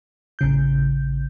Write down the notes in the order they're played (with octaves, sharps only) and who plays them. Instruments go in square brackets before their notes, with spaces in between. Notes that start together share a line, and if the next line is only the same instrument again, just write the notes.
[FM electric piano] A1 C#3 G6